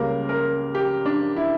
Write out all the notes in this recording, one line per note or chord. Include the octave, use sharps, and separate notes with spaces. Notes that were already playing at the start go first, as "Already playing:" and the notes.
Already playing: C#2 C#3 G3 A#3 A#4
A#4
G4
D4
E4